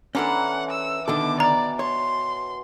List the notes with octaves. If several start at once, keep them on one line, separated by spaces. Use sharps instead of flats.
E3 C#4 D4 A4 A#4 F#5 C6
E6
B2 D3 D#3 A4 D6
D5 A#5
C#5 C6